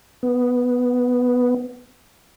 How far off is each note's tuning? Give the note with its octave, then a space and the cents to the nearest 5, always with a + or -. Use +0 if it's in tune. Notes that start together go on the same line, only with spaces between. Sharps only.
B3 +0